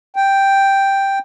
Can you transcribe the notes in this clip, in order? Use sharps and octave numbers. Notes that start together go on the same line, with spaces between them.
G5